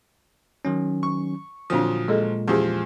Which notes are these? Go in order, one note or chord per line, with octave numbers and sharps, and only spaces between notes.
D#3 F#3 C#4
C#6
A#2 D3 F3 F#3 C4 D4 D#6
A#2 G#3 G#4 A4 D#5
E2 F3 C#4 G4 G#4